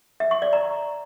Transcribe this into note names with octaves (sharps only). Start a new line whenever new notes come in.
E5
C#6
D5
A#5